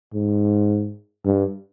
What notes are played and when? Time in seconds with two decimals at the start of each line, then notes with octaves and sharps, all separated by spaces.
0.14 G#2
1.25 G2